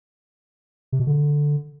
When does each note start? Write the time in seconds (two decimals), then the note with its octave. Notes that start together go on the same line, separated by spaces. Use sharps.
0.92 C3
1.00 B2
1.07 D3